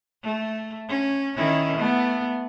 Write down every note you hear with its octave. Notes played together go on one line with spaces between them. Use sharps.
A3
C#4
D#3 C#4 E4
A3 B3